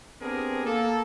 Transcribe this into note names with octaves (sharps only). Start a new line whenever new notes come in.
B3 C4 D4 G4 G#4 A#4
A#3 A4